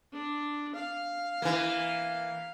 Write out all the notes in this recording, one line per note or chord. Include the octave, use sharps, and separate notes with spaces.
D4
F5
E3 A#3